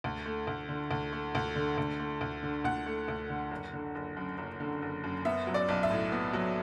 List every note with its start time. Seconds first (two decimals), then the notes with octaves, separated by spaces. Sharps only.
0.04 D2
0.26 A3
0.47 D2
0.69 D3
0.91 D2
1.13 A3
1.35 D2
1.56 D3
1.78 D2
2.00 A3
2.21 D2
2.43 D3
2.64 D2 F#5
2.86 A3
3.08 D2
3.30 D3
3.51 F#1
3.73 D3
3.95 F#1
4.17 F#2
4.38 F#1
4.60 D3
4.82 F#1
5.04 F#2
5.25 B3 E5
5.47 F#3
5.54 D5
5.69 B1
5.83 E5
5.90 A2
6.12 B3
6.33 F#3